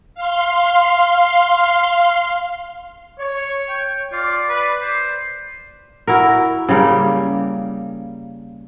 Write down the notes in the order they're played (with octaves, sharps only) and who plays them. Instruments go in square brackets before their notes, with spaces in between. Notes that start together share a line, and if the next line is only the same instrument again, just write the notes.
[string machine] F5 C6
[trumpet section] C#5
[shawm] G5
[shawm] F4 [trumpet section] D5
[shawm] B4
C5
[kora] E4 F#4 A#4
C#3 G3 A#3